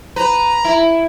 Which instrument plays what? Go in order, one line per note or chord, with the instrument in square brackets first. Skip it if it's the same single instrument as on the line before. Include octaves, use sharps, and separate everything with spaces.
[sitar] B4 [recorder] A#5
[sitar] E4